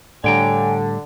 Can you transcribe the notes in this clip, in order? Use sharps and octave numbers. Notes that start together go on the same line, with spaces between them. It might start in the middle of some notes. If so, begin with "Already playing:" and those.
A2 D3 G3 C#5 G5 G#5 A#5